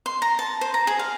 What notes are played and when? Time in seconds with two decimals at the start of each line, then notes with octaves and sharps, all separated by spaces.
0.06 C6
0.22 A#5
0.39 A5
0.61 C5
0.74 A#5
0.87 G#4
0.99 F5